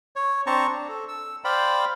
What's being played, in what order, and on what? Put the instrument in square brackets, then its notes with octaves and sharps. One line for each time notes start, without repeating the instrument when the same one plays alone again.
[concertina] C#5
C4 D4 C5 A5 A#5 C#6
D4
A4
E6
C5 D5 F5 G5 B5